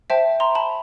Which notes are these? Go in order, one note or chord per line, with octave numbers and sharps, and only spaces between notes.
C5 E5 G5 A5
A#5 C6
A5 B5